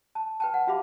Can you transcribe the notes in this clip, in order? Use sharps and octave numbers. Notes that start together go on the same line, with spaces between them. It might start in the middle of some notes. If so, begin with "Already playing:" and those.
A5
B4 G5 A5
F#5
F#4 G4 E5 F5 B5 D6